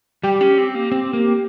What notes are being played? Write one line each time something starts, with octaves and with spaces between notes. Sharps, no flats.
G3 G4
C#4
C4
A#3
C4
A#3